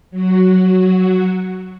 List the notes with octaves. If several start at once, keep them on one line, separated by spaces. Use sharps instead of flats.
F#3 F#4